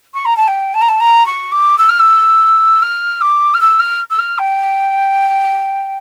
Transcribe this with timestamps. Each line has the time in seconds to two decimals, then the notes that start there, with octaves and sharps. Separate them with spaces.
0.14 C#6
0.25 A#5
0.36 A5
0.47 G5
0.74 A5
0.81 A#5
0.88 A5
1.00 A#5
1.26 C#6
1.52 D6
1.78 E6
1.89 F6
1.99 E6
2.82 F6
3.21 D6
3.54 F6
3.60 E6
3.79 F6
4.10 E6
4.18 F6
4.38 G5